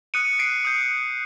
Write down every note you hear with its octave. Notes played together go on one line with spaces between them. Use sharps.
D#6 F#6 C#7 D#7
C7 D7
D#6 G6